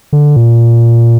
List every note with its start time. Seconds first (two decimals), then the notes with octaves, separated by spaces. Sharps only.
0.13 D3
0.36 A#2